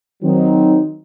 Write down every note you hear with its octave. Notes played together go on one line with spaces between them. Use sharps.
D#3 F#3 C4 D#4